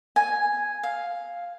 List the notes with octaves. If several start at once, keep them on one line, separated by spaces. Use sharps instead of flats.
G#5
F5